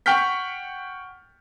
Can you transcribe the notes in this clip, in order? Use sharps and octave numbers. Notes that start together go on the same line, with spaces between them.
F#5 G5 C#6 F6 G6 B6